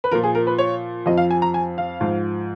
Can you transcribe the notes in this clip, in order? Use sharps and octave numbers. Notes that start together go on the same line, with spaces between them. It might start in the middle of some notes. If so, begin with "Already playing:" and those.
B4
A#2 F3 A#4
G#4
A#4
B4
C#5
F2 F3 D#5
F5
G#5
A#5
G#5
F5
G#2 F3